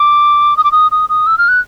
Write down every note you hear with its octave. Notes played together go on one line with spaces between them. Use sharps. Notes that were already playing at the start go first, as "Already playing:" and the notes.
Already playing: D6
D#6
D6
D#6
D#6
D#6
E6
F6
F#6